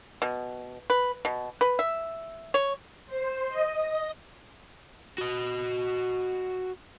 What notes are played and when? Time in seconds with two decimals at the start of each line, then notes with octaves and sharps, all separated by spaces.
0.22 B2
0.90 B4
1.25 B2
1.61 B4
1.79 E5
2.54 C#5
3.07 C5
3.49 D#5
5.18 F#4 D#5